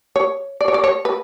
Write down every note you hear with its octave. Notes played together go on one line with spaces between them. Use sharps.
C#5
D5
C#5
D5
C#5
B4